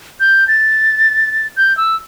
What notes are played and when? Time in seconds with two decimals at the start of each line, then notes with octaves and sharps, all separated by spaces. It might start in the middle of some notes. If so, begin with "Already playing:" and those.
0.20 G6
0.48 A6
1.57 G6
1.77 E6